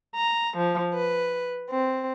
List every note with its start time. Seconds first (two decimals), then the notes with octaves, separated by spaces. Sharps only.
0.15 A#5
0.58 F3
0.94 B4
1.70 C4